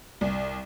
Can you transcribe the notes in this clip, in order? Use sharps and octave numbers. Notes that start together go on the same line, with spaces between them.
C2